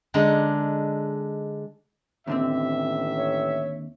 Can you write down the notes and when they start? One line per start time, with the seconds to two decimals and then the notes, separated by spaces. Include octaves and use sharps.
0.14 D3 G#3 D4 D#4 G#4
2.27 A1 D#2 D3 C4 E5
3.17 C#5